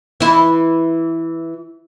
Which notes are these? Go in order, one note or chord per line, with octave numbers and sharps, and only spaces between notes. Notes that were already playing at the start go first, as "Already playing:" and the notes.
E3 E4